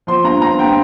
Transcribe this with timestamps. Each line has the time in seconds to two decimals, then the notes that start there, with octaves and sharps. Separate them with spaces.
0.07 F3 C6
0.24 G2 A#5
0.42 G2 A#5
0.58 G2 G5